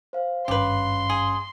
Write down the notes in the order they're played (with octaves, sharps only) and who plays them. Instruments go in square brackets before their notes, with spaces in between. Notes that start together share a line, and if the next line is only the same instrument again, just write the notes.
[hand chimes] C5 F5
[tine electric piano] G#1 G2 C#4 [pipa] G4 B4 [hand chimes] F5 [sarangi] C6
[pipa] G#4